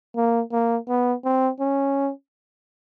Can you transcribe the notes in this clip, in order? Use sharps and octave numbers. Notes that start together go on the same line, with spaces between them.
A#3
A#3
B3
C4
C#4